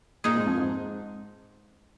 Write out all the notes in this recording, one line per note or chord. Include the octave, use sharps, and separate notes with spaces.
A#2 G#3 D#4 G#4
G#2
F2
G#2